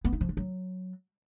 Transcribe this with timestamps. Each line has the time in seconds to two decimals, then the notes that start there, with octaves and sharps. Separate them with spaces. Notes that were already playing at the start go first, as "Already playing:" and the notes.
0.05 B3
0.13 D#4
0.21 F3
0.29 D4
0.37 F#3